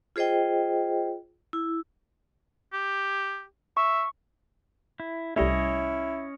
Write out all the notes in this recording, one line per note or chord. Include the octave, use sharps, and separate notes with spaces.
F4 G#4 C5 D#5 G5
E4
G4
E5 C#6
E4
C2 G3 A3 C#4 E4 C#5 D#5